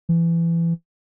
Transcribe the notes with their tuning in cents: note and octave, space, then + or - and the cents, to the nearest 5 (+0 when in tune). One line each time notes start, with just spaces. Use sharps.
E3 +25